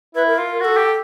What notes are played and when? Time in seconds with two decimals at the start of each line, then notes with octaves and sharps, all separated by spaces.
0.15 E4 B4
0.26 A#4
0.38 F4
0.60 F#4 A4 A#4
0.77 G4